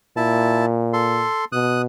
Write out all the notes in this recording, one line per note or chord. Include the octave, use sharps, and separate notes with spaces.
A#2 E4 A5
A4 C6
B2 D#6 F#6